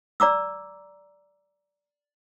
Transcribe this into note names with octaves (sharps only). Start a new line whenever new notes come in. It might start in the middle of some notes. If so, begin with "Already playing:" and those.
D5 A#5 D6 E6